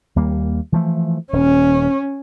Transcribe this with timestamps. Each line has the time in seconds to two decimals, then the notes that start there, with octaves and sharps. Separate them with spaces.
0.16 D#2 G3 A#3
0.72 E3 F3 A3
1.33 D#1 C#4